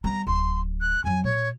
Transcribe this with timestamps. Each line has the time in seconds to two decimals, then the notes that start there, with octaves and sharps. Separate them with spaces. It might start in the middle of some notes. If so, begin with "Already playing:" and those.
0.04 G3 B3 A#5
0.27 D1 C6
0.81 F#6
1.04 F2 F#3 G#5
1.24 A#2 C#5